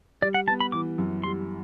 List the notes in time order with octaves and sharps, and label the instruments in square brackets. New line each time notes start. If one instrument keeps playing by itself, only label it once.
[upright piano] G3 [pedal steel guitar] D5
[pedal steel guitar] F#5
[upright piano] B3 [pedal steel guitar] A5
[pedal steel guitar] B5
[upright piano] E3 [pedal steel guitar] D6
[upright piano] F#2
[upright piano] G3 [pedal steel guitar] C6